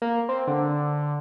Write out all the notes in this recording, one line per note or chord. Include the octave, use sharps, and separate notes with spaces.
A#3
C4
D3